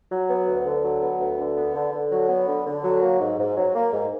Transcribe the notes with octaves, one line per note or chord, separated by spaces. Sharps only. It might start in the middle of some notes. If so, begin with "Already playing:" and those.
F#3
B3
D2
D3
F#3
B3
D2
D3
B3
D3
D3
F#3
B3
D3
D3
F#3
A#3
G#2
G#2
F#3
A#3
G#2